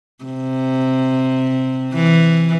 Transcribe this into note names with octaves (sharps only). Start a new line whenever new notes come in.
C3
E3